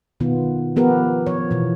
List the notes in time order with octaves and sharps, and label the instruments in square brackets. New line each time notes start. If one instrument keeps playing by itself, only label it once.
[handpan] B2 D#3 B3 F4
F3 B3 G4 A#4
F3 C#5
B2 E3